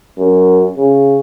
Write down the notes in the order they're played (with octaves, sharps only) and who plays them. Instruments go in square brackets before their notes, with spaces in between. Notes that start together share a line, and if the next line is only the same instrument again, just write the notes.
[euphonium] F#2
C#3